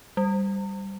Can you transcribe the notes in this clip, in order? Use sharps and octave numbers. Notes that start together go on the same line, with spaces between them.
G3